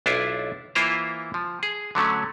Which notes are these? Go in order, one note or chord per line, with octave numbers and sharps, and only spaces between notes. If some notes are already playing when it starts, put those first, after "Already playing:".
B1 D4 E4 F4 E5
E3 A#3 E4 F4 C5 A#5
F3
G#4
D3 F#3 A3 C#4